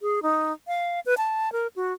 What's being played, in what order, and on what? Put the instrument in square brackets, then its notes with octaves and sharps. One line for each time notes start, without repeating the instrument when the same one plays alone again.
[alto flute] G#4
D#4
F5
B4
A5
A#4
F#4